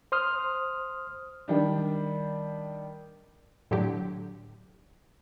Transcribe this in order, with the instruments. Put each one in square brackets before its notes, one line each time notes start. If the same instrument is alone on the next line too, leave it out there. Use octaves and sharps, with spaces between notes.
[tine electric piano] C5 C6 D#6 F6
[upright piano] D#3 G3 D4
[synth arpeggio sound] A2 D3 F#3 G4